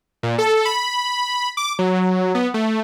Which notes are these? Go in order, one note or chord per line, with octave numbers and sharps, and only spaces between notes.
A#2
A4
B5
D6
F#3
B3
A3